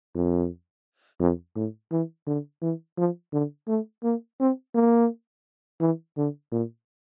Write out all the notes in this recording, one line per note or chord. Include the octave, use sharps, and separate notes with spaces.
F2
F2
A2
E3
D3
E3
F3
D3
A3
A#3
C4
A#3
E3
D3
A#2